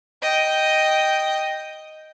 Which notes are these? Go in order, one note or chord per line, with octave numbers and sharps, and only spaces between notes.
D#5 G5